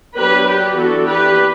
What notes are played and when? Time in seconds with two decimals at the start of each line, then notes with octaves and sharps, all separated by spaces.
0.16 F#3 B3 D4 G4 B4
0.45 G4 B4
0.75 E3 B3 D4 F#4 A4
1.05 G4 B4